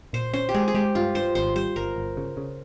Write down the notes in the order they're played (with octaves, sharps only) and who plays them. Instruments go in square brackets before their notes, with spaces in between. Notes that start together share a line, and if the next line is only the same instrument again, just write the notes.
[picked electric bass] A#2 [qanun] C5
[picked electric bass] C#4 [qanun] C5
[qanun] G4
[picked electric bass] G#3 [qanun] G#4
[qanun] G#4
[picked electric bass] G#3 [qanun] G4
[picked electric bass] G2 [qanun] F4
[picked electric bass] G2 [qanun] C5
[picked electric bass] G#1 [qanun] C5
[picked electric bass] G3 [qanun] C5
[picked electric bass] G1 [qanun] A#4
[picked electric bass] G1
C#3
C#3